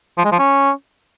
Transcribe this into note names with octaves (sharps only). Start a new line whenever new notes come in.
F3
G#3
F3
C#4